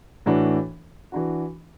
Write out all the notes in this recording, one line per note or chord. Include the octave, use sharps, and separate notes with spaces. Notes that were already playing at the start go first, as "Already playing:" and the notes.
A2 E3 D4 F#4
E3 D4 F#4